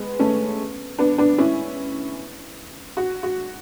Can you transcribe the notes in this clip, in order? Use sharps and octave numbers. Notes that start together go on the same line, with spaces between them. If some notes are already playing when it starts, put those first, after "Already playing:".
Already playing: G#3 B3
A3 C#4
B3 D4
B3 D4
C#4 E4
F#4
F#4